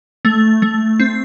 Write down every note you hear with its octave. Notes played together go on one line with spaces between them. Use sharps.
A3
A3
C4